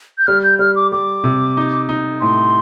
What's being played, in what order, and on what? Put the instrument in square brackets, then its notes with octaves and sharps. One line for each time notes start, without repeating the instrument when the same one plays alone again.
[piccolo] G6
[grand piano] G3 [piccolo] F6
[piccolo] G6
[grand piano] G3 [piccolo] F6
[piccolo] D6
[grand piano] G3 [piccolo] D6
[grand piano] C3
D#4
D#4
[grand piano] A2 [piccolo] C6